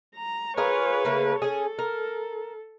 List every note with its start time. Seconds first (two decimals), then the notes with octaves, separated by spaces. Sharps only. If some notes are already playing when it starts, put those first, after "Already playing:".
0.16 A#5
0.57 F4 G#4 A#4 B4 C#5
1.05 C#3 A3 A#3
1.42 C#4 G#4 A4
1.79 A#4